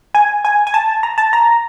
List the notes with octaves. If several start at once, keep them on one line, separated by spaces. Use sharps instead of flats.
G#5
G#5
G#5
A5
A#5
A5
A#5